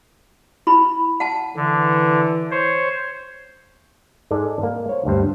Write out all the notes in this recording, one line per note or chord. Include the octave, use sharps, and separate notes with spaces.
E4 B5
F#5 A5
D3 E3
C5 C#5
G#2 G#3 A4 D5
A#3
C5 C#5
D2 G2 C5